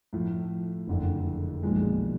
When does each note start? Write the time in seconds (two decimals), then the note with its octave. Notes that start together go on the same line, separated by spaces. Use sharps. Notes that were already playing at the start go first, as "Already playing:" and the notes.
0.13 A2 F3 A3
0.87 F#1 F2 D3
1.63 B1 A#2 F3 G#3